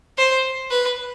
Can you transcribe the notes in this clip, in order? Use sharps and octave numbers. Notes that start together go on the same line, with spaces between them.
C5
B4